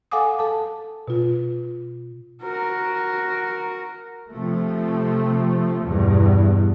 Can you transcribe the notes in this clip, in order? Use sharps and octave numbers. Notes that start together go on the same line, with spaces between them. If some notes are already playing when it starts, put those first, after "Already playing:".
A4 F5 F#5 G#5 D6 D#6
A4 A5
B2 F4
F#4 A#4
C3 F3 A3
E2 G2 B2